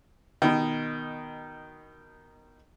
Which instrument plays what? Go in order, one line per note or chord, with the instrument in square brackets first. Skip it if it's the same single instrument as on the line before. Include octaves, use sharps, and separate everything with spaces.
[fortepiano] B2 D#3